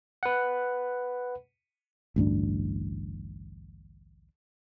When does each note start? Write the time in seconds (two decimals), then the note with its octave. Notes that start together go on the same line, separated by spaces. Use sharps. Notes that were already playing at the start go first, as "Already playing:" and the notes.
0.23 B4 F#5
2.16 A1 D2 G2 D4